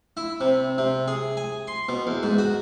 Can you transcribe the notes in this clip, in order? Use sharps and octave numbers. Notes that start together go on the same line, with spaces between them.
E4
C3
C3
G#4
G#5
C6
B2
E2
G#2
F#4